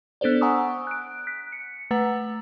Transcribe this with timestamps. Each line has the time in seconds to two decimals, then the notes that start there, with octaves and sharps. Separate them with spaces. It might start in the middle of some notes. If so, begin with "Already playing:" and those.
0.21 B3 D4 A4 C5 D5
0.41 F#5 G#5 A#5 C#6 D#6 E6
0.87 F#6 D7
1.27 F#6 B6
1.52 C#7
1.91 A3 B4 F#5 A#5